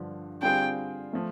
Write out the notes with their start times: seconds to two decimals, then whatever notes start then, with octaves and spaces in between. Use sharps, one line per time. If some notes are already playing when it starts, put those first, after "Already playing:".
Already playing: G2 D3 F3
0.42 D3 G3 C4 F4 G#4 G5
1.13 F3 A3